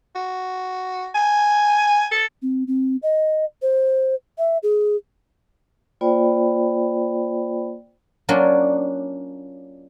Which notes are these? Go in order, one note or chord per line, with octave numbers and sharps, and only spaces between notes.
F#4
G#5
A4
C4
C4
D#5
C5
E5
G#4
A#3 F4 C5 D5 G5 B5
F#3 A#3 C#4 D4 F4